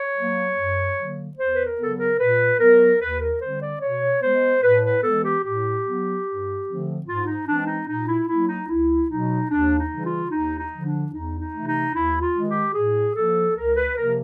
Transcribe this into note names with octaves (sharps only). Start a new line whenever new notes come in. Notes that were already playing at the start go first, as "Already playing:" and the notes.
Already playing: C#5
F#3 A#3
F#2
D3 F#3 A#3
E2 C5
B4
A#4
C#3 F#3 B3 A4
A#4
A#2 B4
F#3 B3 A#4
D#2 B4
A#4
D3 G3 C4 C5
D5
B2 C#5
G#3 B3 C5
A2 B4
B4
E3 G#3 B3 A4
G4
A2 G4
F#3 B3
G2
D3 F3 A3 C4
G#2 F4
D#4
E3 G#3 C4 D4
D#4
A#2 D#4
E4
F#3 A#3 E4
D#4
C#2 E4
B2 F#3 D#4
D#2 D4
D#4
C#3 E3 G3
F4
D#2 D#4
D#4
D3 F3
D4
E2 D#4
D#4
C3 E3 A3
D#4
D#2 E4
F4
D#3 G#3
G4
A2 G#4
F3 A#3 A4
C#2 A#4
B4
C3 F3 A#3 A#4